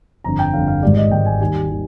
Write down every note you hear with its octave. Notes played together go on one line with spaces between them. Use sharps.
G1 F2 D3 A#5
G5
G1 F2 D3 F5
F5
G#1 G#2 G3 D5
D#5
G#1 G#2 G3 G5
G#5
D#2 D#3 G3 G#5
D#3 G3